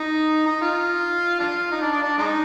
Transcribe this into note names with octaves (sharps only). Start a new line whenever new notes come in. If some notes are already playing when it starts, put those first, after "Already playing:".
Already playing: D#4
D#4
F4
D4 F4
D#4
D4
D4
D4
G#3 D#4